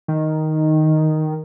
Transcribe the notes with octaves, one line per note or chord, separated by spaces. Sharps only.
D#3